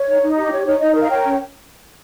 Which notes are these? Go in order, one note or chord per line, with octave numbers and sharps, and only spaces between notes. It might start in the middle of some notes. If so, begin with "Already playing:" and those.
Already playing: C#5
D#4
D#4
G4
C#5
D#4 C#5
D#4 D#5
A#4
F5
C#5 G5
C#4